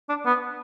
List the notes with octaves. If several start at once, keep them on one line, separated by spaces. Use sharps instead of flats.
D4
B3